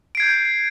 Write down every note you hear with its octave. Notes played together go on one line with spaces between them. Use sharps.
G6 G#6 C7 D7